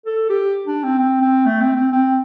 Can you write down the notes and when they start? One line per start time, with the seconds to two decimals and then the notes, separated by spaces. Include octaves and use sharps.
0.06 A4
0.30 G4
0.67 D4
0.84 C4
0.99 C4
1.21 C4
1.46 A3
1.61 C4
1.76 C4
1.92 C4